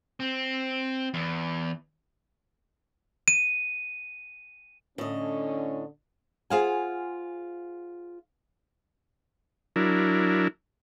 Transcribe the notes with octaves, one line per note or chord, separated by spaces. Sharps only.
C4
E2
D#7
A2 D3 C#4 D#5
F4 G#4 C5 F5 F#5 G#5
F#3 D4 E4 A#4